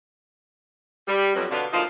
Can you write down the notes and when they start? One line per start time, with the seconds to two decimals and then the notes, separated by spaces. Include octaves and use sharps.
1.08 G3
1.35 F2 B2 F#3
1.51 B2 D3 B3 D4 F5
1.73 D2 F3 A#3 D#4 F4 F5